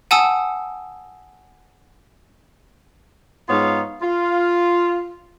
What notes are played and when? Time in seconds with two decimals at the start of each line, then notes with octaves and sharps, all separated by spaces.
0.11 F#5 G#5 A5 D#6 E6
3.49 G#2 B3 D#4 F4 C#5 F5
4.02 F4